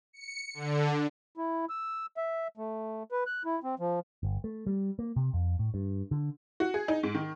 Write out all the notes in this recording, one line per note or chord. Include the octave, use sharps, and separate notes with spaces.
C#7
D3
E4
E6
E5
A3
B4
F#6
E4
C4
F3
G1
A3
G3
A#3
C3
F2
A2
G2
D3
F#4
G#4
D#4
G#2
D#3